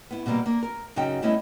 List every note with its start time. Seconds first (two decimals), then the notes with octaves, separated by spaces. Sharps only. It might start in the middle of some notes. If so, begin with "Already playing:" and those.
0.11 B3 E4
0.26 B2 D3 G3 A#3
0.46 A#3 D4
0.63 A#4
0.96 F#2 C#3 D#4 F#4 G5
1.22 G3 A3 B3 C#4 E4 D#5